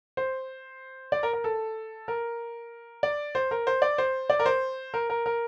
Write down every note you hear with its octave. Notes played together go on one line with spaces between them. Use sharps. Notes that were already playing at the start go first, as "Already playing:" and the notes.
C5
D5
A#4
A#4
A4
A#4
D5
C5
A#4
C5
D5
C5
D5
A#4
C5
A#4
A#4
A#4